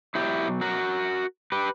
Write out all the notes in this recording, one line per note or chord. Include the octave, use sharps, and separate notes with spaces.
B2 F#3 E4 G4
F#4 A#4
G4 B4